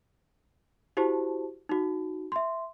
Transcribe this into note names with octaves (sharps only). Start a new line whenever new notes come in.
E4 F#4 G4 C5 A5
D#4 F#4
E5 C6